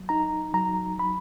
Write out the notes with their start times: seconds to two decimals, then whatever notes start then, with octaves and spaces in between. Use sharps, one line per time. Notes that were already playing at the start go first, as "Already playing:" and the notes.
Already playing: F#3
0.09 D#4 A#5
0.54 F#3 A#5
0.99 F#3 B5